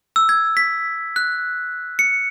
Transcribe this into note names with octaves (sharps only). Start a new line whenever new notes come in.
E6
G#6
B6
F#6
C#7